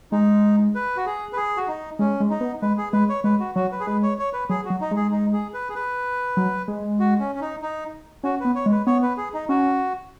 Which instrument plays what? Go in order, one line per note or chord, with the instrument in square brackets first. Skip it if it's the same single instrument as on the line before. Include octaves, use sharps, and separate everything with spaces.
[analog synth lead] G#3 [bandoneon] D#4
[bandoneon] B4
F#4
G#4
B4
G#4
F#4
D#4
[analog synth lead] G#3 [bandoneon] C#4
[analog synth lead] G#3
[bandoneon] D#4
[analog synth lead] B3
[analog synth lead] G#3 [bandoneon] B4
[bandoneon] G#4
[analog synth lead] G#3 [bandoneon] B4
[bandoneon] C#5
[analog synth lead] G#3 [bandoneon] B4
[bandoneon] F#4
[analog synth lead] F#3 [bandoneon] F#4
[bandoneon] B4
G#4
[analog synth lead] G#3 [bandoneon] B4
[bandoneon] C#5
C#5
B4
[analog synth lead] F#3 [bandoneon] G#4
[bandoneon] F#4
[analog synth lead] F#3
[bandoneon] D#4
[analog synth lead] G#3
[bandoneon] G#4
D#4
G#4
B4
G#4
B4
[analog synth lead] F#3
G#3
[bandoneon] F#4
C#4
C#4
D#4
D#4
[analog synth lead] C#4 [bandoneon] F#4
[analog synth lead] B3 [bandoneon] B4
[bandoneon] C#5
[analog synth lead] G#3
[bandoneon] B4
[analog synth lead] B3 [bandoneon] C#5
[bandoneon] B4
G#4
D#4
[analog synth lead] C#4 [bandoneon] F#4